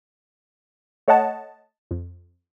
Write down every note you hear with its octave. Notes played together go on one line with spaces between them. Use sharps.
A3 C#5 D#5 F#5 A5
F2